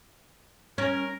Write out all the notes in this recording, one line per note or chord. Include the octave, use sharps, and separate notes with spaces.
C#4 A#4